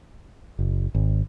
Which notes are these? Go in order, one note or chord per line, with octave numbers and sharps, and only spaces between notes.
F#1
G#1